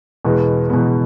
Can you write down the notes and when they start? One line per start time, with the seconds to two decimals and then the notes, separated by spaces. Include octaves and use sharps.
0.25 E2 B2 G#3 B3
0.70 E2 B2 G#3 B3